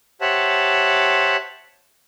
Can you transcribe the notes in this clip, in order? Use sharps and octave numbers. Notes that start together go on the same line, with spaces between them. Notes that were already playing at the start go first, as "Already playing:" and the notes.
G4 C5 C#5 E5 F#5 A5